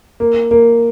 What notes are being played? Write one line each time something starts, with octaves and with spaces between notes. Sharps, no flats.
A#3
A#3